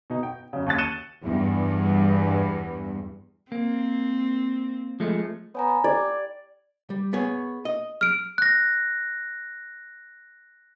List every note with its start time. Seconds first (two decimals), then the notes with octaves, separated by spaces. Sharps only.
0.10 B2 D#4
0.23 G5
0.53 F#2 C#3
0.66 D#2 C#4 A5 F#6 A6
0.78 F#6 C#7 D#7 E7 G7
1.23 E2 G2
3.52 A#3 C4
5.00 F3 G#3 A3
5.55 B3 C#5 G#5 A#5
5.84 G4 D5 G#6
6.90 G3
7.13 B3 G#4 C#5
7.65 D#5
8.01 F6 D7
8.38 F#6 A#6